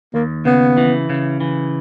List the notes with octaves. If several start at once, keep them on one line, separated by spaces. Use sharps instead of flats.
D#2 A#3
C#3 B3
E3
C#3
E3